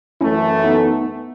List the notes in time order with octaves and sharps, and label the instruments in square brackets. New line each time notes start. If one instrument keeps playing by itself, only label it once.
[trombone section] F#2 E3 A3 [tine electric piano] C#4 E4
[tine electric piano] B3 D#4